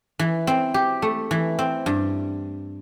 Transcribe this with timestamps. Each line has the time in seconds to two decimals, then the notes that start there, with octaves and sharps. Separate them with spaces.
0.19 E3
0.47 C4
0.74 G4
1.02 A3
1.31 E3
1.59 C4
1.86 G2